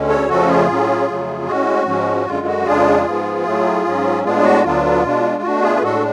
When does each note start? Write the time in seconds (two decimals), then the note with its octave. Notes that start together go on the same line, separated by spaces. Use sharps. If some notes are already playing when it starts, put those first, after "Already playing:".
Already playing: D2 D3 G#3 C#4
0.08 A4 C#5
0.28 F2 C#3 F3 A3 C#4 F#4 A4
0.48 F4 G#4
0.68 A2 F#3 C#4
1.08 F2 C#3 F#3 A3
1.47 A2 G#3 C#4 F#4
1.86 G#2 F3 G#3 C#4
2.26 F#2 D3 G#3 F4
2.47 F#4
2.65 F2 C#3 G#3 D4 F4 G#4
3.05 G#2 F3 B3
3.45 A2 F#3 A3
3.85 G#2 F#3 C#4
4.24 A2 G#3 B3 D4 F4 G#4
4.44 F#4
4.64 D2 D3 F#3 B3 D4 F4
5.03 B2 G#3 D4
5.42 B2 A3 D4 F#4
5.63 F4 G#4
5.76 B4
5.82 A2 G#3 D4 F#4 A4